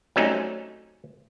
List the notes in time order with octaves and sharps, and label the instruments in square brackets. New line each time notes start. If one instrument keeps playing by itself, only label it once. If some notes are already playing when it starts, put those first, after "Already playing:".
[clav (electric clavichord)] F#3 G3 A3 C4 C#4 D#4